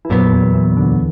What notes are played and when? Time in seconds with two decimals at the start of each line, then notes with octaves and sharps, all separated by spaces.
0.05 E3
0.10 F2 A#2 F3 F#3 B3
0.32 E2 E3
0.54 E2 E3
0.77 D2 D3